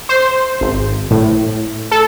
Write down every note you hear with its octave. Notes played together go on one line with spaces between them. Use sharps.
C5
G#1
A2
A4